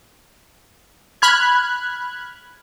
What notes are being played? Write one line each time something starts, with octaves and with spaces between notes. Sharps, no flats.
B5 F6 F#6 G#6